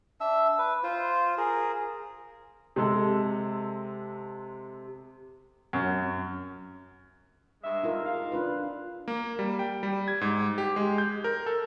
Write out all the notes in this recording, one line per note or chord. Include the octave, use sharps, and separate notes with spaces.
D4 E5 E6
B4
F4 C5
G#4 A#4
C3 G#3 A4
F#2
G2 G#3 E5
D#4 F4 A#4
G#2 F5
D4 F4 B4
A#3
G3
G5
G3
G#6
G#2
G4
G#3
G6
A#4
A4